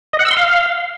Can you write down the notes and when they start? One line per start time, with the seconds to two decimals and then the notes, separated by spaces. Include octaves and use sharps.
0.13 D#5
0.19 F#5
0.25 E6
0.31 C6
0.37 F5